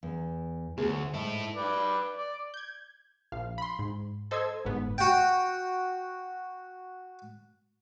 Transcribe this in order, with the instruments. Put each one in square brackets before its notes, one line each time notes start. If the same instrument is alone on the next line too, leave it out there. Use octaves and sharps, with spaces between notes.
[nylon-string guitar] E2
[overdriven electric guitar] D2 [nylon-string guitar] B3 G#4
[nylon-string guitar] C#5
[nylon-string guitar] G#2 [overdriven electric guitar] E4 A4
[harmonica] B4 D5
D5
[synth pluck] G6 G#6
A#1 F5
B5 C6
G#2
A4 C5 D#5 C6 E6 G#6
G1 G#2 B3
[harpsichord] F#4 G5